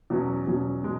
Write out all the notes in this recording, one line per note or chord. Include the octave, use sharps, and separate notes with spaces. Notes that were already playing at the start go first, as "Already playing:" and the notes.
E2 B2 F#3 C#4
E2 B2 F#3 C#4
B2 G#3